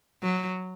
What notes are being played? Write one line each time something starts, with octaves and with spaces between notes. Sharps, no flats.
F#3